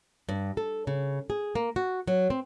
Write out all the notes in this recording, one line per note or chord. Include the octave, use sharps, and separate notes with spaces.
G2
A4
C#3
G#4
A#3
F#4
F#3
C4